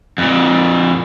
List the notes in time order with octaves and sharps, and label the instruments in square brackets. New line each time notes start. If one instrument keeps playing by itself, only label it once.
[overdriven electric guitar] F2 A#2